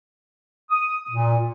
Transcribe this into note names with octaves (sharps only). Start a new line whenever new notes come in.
D#6
A#2